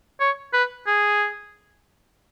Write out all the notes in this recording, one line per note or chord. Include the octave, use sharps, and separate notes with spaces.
C#5
B4
G#4